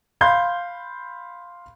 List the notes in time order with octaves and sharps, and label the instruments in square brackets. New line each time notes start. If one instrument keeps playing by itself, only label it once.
[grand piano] F5 B5 C6 G6